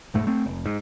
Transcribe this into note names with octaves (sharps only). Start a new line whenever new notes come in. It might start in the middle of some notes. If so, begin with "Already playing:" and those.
E1 G#2 A3
A3 C4
F1
G#2